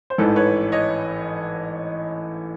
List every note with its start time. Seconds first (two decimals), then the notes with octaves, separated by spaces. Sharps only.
0.10 C5
0.18 A1 G#2 E3 A4 B4
0.36 B4 C#5
0.72 C#5 D#5